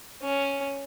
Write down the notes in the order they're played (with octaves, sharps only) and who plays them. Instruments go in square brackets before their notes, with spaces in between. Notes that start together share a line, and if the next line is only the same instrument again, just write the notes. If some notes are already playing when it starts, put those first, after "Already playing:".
[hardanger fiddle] C#4